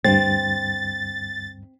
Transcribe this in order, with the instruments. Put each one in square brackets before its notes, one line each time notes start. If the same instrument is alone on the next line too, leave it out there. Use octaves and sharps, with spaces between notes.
[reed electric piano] D2 G2 [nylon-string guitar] C4 [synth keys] A6